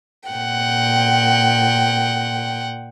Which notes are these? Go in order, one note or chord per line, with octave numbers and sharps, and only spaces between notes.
A#2 F#5 G5